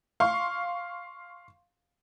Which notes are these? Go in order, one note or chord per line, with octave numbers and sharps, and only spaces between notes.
F5 C6 C#6